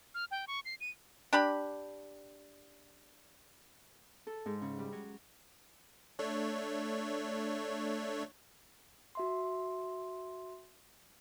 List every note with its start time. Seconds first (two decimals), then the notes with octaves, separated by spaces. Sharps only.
0.15 F6
0.31 G5
0.47 C#6
0.65 C7
0.81 D#7
1.33 D4 G4 B5
4.27 A4
4.46 G#2
4.62 C#3
4.79 G3
4.92 F#3
6.19 A3 D4 C#5
9.15 F#4 E5 C6